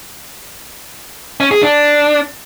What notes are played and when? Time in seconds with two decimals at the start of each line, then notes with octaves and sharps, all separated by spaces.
1.40 C#4
1.51 G#4
1.63 D4